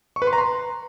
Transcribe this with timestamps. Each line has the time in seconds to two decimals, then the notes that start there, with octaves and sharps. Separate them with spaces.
0.16 C#6
0.22 B4
0.27 C6
0.33 A#5
0.38 C6